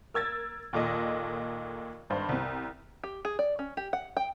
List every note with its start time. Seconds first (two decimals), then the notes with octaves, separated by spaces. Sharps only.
0.14 A#4 E6 G#6 A6
0.73 D#2 A#2 A4 D#5
2.10 G#1 G2 C5
2.29 C2 C3
3.04 G4
3.25 G#4
3.39 D5
3.59 C#4
3.77 G4
3.93 F#5
4.17 G5